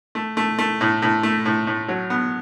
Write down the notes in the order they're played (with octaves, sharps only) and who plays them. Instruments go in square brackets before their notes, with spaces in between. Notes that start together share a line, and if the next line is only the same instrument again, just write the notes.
[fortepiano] A3
A3
A3
A2
A2
A3
A2
A2
F#3
B3